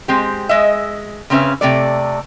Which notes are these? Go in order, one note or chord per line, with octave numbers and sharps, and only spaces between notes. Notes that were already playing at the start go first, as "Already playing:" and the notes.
G#3 C4 G4
G#3 D#5 E5
C#3 C4 C#4 B4 E5
C3 A3 D5